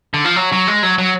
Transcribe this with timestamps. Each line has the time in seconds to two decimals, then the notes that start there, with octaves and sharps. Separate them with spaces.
0.14 D3
0.25 F3
0.36 F#3
0.52 F#3
0.67 G#3
0.83 F#3
0.98 F#3